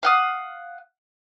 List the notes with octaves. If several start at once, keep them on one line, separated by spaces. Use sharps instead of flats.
F5 F#5 D#6